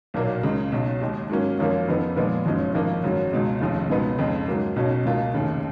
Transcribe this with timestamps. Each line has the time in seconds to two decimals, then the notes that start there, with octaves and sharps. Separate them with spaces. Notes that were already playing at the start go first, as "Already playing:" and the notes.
0.14 B1 A#2 F#3 A#3
0.43 C#2 C#3 G#3
0.72 B1 B2 F#3
1.01 D#2 D#3 G#3
1.30 G#2 F#3 A#3 C#4
1.59 G#1 F#2 F3 A#3
1.88 F2 C#3 F3 B3
2.16 A#2 F3 G#3 B3
2.45 F#1 F#2 F3 G#3 C#4
2.75 G#1 G#2 F3 A#3
3.03 G#1 F#2 C#3 F#3
3.32 C#2 B2 G#3
3.61 F1 D#2 C#3 F3
3.90 C#2 B2 G#3 B3 D#4
4.18 F2 C#3 G#3 D#4
4.47 G#2 F#3 A#3
4.76 B1 B2 F#3 C#4
5.05 C#2 B2 A#3 F4
5.34 F1 D#2 C#3